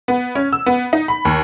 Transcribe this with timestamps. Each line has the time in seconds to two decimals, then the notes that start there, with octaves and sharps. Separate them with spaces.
0.08 B3
0.35 C#4
0.53 E6
0.66 B3
0.93 D#4
1.08 B5
1.25 D#2